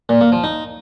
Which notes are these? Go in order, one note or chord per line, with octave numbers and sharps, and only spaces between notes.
A#2
A#3
F3
D#4